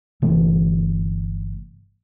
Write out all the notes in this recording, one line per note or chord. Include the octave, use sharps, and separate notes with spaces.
G1 C3 E3 A3